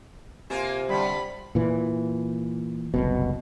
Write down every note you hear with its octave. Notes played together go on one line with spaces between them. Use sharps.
C3 A#3 F4 C5 G#5
D3 G3 F4 B5
A#2 E3
F#1 C2 B2